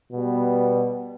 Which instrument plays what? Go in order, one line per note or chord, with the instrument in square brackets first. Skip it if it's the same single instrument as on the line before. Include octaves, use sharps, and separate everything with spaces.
[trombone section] B2 G3 B3